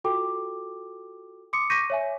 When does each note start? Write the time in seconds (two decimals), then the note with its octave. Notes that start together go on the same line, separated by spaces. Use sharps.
0.04 F4 F#4 A4 G5 D6
1.53 C6 D6 D#6 C#7
1.70 C#6 D6 G6 A#6 B6 D#7
1.90 C#5 E5 G#5